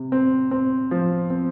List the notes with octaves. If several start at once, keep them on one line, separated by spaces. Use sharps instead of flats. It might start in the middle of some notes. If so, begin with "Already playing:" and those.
Already playing: C3
C4
C4
F3
C4